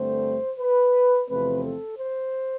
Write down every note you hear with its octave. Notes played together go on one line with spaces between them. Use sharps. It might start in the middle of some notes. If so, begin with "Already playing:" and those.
Already playing: G2 D3 A3 C4 C5
B4
E2 C3 F3 A3 C4 B4
A4
C5